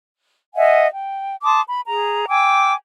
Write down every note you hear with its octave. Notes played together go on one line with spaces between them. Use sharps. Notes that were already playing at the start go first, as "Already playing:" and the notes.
D#5 E5 F#5 G#5
G5
A5 C6 D6 D#6
B5
G#4 A#5
G5 G#5 D6 E6